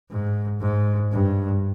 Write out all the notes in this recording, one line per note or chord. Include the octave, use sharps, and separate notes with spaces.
G#2
G#2
G2